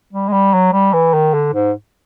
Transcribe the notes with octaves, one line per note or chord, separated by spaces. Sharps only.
G3
G#3
G3
F#3
G3
E3
D#3
D3
G#2